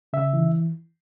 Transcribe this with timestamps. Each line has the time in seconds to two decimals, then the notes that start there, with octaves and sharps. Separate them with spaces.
0.13 C#3 E5
0.33 E3